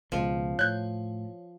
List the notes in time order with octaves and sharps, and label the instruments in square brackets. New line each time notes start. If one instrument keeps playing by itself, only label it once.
[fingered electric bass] C#2 B2 [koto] F3
[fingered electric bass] A2 [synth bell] C#5 [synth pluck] F#6 G6